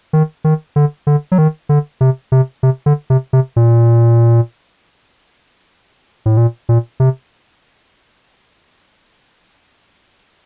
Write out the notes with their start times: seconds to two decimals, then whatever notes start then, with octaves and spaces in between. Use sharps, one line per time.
0.13 D#3
0.44 D#3
0.76 D3
1.07 D3
1.32 F#3
1.38 D#3
1.69 D3
2.01 C3
2.32 C3
2.63 C3
2.86 D3
3.10 C3
3.33 C3
3.56 A#2
6.26 A2
6.37 A#2
6.69 A#2
7.00 C3